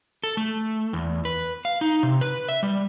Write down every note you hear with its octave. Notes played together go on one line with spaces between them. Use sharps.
A4
A3
E2
B4
F5
D#4
C3
B4
E5
G3